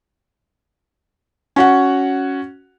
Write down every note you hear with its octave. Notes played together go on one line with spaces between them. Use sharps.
C#4 F#4 F#5